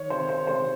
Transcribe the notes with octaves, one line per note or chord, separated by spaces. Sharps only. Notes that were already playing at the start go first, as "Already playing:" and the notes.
Already playing: D#3 C#5
C3 C5
C5
C3 C5